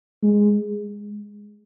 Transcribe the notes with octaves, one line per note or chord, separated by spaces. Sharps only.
G#3